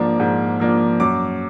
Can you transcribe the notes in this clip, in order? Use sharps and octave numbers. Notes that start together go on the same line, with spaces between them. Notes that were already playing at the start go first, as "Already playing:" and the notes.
Already playing: G#2 F3 A#3 D4
G#2
F3 A#3 D4
F#2 D6